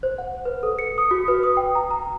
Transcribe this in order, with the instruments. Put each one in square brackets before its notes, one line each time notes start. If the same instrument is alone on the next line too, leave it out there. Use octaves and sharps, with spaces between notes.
[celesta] C5
F#5
B4
A4
C#7
D#6
F#4
B4
D#6
G5
A#5
A#5